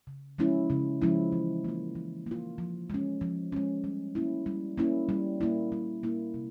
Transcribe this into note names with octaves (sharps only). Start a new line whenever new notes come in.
C#3
F3 G#3 C#4 E4
C#3
F3 G#3 C#4 E4
E3
A#3 F4
E3
A#3 F4
F3
G#3 C#4
F3
G#3 C#4
G3
A#3 C#4 E4
G3
A#3 C#4 E4
G3
A#3 E4
G3
A#3 E4
C3